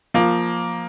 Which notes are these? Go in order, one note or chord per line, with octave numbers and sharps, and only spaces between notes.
F3 A#3